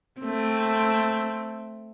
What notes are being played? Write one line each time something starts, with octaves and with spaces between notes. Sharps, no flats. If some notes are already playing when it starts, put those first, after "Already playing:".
A3 C4